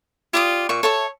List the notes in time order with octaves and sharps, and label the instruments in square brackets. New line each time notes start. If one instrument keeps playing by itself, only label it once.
[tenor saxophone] F4 [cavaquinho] G4 D5 D#6
[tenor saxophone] A#2 [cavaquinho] E5 C#6
[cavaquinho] A4 E5 C#6 [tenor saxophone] C#5